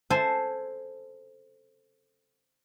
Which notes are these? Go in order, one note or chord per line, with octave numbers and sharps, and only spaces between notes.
A4 C5 G#5